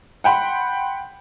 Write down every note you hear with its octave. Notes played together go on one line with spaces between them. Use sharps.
F#5 G5 B5 C6